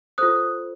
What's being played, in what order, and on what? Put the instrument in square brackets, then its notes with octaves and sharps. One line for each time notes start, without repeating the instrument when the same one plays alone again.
[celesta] F4 A4 C5 D#6 F#6